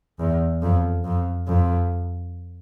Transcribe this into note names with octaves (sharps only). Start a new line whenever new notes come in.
E2
F2
F2
F2